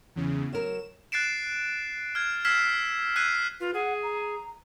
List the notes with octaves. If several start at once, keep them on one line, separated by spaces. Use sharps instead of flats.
E2 C#3
F#3 A#4 E7
F#6 A6 C7 D7 E7
F6 G#6
E6 F6 G#6 B6 C7 E7
E6 F#6 G#6 B6 C7 D#7
F4 B4
G#4 F#5
A#5